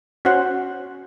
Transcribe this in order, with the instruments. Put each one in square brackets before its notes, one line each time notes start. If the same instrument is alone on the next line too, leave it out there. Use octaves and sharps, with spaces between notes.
[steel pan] C#4 F#4 C5 F#5